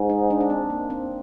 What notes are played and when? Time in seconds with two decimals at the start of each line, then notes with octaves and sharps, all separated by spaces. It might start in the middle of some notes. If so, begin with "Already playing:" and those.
Already playing: G#2
0.10 D#4
0.30 D4
0.41 D4
0.50 C4
0.70 A#3
0.90 C4